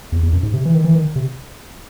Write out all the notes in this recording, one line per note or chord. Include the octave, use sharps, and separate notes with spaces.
E2
E2
F#2
G#2
C3
E3
D#3
E3
D#3
C3